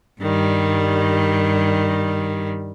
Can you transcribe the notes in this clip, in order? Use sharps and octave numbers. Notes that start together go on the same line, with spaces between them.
G2 D#3 G3